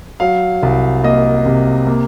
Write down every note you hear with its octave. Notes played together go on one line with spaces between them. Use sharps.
F#3 F5
C2
A#3 D#5
C3
A#3